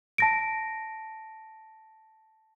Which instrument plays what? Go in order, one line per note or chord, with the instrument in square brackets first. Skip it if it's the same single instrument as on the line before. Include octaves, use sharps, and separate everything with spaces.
[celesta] A5 A#6 D7